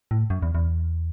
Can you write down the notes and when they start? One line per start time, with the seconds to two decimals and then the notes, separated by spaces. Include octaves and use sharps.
0.11 A2
0.30 F#2
0.42 E2
0.55 E2